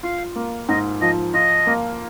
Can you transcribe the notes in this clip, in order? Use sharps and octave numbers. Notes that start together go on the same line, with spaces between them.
F4 F5
A#3
G#2 D#5
F3 D#5
F4 D#5
A#3